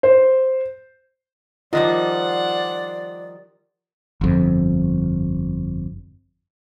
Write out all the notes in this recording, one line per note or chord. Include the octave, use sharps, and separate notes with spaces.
C5
D#3 F3 G3 F4 C5 D5 D#5 F#5
G1 F2